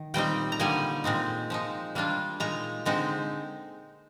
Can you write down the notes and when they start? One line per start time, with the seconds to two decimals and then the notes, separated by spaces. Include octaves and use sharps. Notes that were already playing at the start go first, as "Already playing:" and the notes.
Already playing: D#3
0.14 A#2 G3 C4 D#4 G5
0.52 A#5
0.59 D3 G3 A#3 D#4 G#5
1.04 A#2 G#3 C4 D#4
1.50 F3 G#3 D#4
1.95 G3 A#3 D4 F4
2.40 A#2 G#3 D#4 A#5
2.85 D3 G#3 C4 D#4